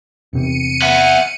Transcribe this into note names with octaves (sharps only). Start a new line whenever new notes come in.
E2 C3 C4 C#7 D#7
E5 F#5